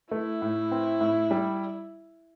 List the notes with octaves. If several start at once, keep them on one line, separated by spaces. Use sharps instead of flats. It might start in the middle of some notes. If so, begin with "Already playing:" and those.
A3 E4
A2
C4
A2
G3